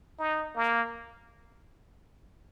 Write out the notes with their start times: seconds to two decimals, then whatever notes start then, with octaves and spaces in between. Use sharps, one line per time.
0.19 D#4
0.56 A#3